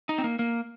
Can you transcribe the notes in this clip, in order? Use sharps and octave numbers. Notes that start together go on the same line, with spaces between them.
D#4
C4
A#3
A#3